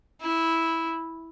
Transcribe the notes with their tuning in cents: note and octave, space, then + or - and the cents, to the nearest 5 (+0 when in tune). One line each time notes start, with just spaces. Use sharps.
E4 -10